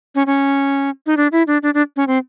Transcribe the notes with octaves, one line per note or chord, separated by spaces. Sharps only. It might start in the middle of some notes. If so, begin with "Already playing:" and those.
C#4
C#4
D#4
D4
E4
D4
D4
D4
C#4
C4